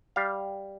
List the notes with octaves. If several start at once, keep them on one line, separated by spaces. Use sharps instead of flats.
G3 F5